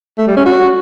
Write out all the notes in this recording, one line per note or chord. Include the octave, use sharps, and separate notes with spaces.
A3
G3
C#4
F#4